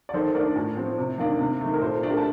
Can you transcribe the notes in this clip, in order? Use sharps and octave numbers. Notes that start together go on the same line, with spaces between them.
D5
D#3 A4 C5
A3 D4 A#4 D5
A2
F3 C4
C3
D#3 A#3 D4
C3
D#3 A3
A#4
A#2 A4 C5
A3 D4
G4 A#4
A5